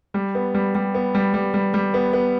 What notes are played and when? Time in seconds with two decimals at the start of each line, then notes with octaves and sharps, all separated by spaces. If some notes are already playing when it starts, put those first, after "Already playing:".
0.14 G3
0.35 B3
0.54 G3
0.75 G3
0.94 B3
1.15 G3
1.34 G3
1.54 G3
1.74 G3
1.94 B3
2.13 B3